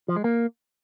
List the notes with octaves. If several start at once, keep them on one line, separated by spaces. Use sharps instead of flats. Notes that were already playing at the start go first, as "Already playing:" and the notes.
F3
G#3
A#3